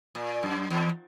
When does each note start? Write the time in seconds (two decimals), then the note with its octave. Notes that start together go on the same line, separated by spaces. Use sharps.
0.15 A#2
0.43 F#2
0.70 E2